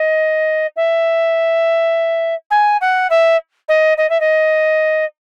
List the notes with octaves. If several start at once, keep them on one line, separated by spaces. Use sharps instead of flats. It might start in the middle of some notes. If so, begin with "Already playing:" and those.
Already playing: D#5
E5
G#5
F#5
E5
D#5
D#5
E5
D#5